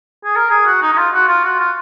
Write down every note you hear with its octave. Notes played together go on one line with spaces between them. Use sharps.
G#4
A#4
G#4
F#4
D#4
D#4
F4
F#4
F4
F#4
F4